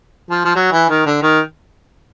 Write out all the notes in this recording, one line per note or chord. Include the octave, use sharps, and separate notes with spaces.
F3
F3
F#3
E3
D#3
D3
D#3